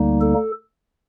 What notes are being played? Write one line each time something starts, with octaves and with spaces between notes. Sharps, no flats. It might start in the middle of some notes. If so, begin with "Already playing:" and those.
Already playing: D2 D3 G3 A#3 D#4
A4